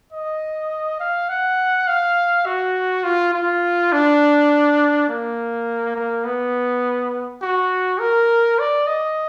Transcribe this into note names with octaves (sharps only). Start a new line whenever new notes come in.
D#5
F5
F#5
F5
F#4
F4
F4
D4
A#3
A#3
B3
F#4
A#4
D5
D#5